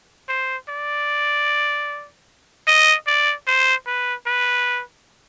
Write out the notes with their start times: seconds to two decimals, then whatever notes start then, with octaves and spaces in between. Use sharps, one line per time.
0.29 C5
0.69 D5
2.67 D#5
3.07 D5
3.47 C5
3.87 B4
4.26 B4